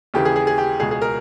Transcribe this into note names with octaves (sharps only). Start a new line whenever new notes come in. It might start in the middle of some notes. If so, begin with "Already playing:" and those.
D#2 C#3 E3 G4
G#4
G#4
G#4
G4
C#2 B2 G#4
G#4
A#4